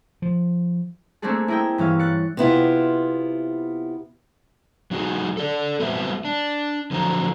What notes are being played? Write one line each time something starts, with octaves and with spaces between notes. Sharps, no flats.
F3
A3 A#3 C4 D4 G#4 A4
E4 G#4 A#4 D#5 G5
G2 E3 C#4 F5
F#6 A6 C#7
C3 B3 E4 F4
F#3 D#4 F#4 G#4
A4 D5
F#3 G3 B3 C4 B4 E5
D4
D3 F3 F#3 A5 A#5